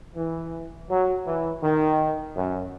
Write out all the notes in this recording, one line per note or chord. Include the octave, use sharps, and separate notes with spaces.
E3
F#3
E3
D#3
F#2